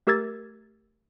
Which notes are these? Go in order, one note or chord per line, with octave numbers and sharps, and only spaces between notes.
A3 G4 A#4 E6 G#6 A6